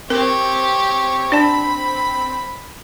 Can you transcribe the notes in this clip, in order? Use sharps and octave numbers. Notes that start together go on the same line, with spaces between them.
C4 G4 A#4 C#5
D4 D5 A5 B5